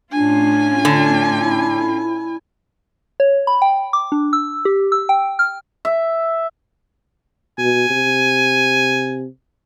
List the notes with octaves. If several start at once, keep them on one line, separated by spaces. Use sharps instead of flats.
A2 C#4 D4 F4 G#5
D3
E4
C#5
B5
G5
D6
D4
E6
G4
E6
G5
F6
E5
B2 G#5
C3